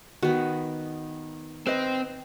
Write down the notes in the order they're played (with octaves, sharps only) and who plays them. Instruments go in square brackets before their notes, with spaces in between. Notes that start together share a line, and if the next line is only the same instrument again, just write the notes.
[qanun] D#3 B3 [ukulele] F#4
[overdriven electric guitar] C4 [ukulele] B4 D#5